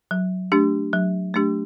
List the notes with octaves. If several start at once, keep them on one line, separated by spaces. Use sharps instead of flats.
F#3
A3 D4 G4
F#3
A3 D4 G4